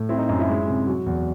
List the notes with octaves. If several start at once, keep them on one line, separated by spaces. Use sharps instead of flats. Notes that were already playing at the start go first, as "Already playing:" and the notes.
Already playing: A2
C4 E4
D#4
F#2 D#4
E4
G#3
C3
F#3 F#4
E2